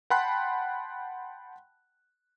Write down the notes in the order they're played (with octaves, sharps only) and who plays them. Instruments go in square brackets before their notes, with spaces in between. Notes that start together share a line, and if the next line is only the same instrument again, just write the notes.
[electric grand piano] F#5 G5 A5 B5 C6 F#6